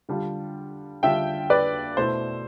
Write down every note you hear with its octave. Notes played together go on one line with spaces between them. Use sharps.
D3 G3 D4 F4
D3 G3 D4 F4 E5 G5
B4 D5
B2 A3 E4 C5